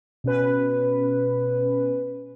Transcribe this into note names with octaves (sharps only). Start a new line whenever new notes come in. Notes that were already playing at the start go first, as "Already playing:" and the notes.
B2 C#4 B4